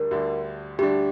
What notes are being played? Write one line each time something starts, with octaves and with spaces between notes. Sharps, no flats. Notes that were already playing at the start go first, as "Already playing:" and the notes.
Already playing: D2 D3 G3 D4 A#4
D2 D3 G3 D4
D2 D3 G3 D4 G4